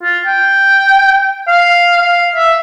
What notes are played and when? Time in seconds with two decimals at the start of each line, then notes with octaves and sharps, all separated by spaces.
0.03 F4
0.26 G5
1.48 F5
2.01 F5
2.36 E5